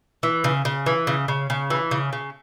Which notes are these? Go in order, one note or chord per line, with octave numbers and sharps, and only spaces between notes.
E3
C#3
C#3
E3
C#3
C#3
C#3
E3
C#3
C#3